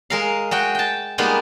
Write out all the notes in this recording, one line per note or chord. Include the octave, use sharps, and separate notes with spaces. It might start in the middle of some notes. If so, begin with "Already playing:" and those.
G#3 A#4 F5
G#3 F#4 G5
G5 A5
G3 G#3 A#3 B3 D#4 F4